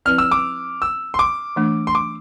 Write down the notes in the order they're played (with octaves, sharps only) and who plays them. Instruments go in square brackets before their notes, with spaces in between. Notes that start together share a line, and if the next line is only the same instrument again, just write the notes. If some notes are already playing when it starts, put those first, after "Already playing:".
[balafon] F3 C4 E4 B4 D5 [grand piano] F6
[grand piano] E6
D6
E6
C6
D6
[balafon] E3 A3 D4
[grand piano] C6
D6